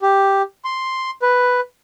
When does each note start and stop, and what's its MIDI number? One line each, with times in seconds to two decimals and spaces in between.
0.02 0.42 67
0.65 1.11 84
1.22 1.60 71